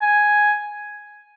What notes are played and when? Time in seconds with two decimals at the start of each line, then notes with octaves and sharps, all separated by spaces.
0.02 G#5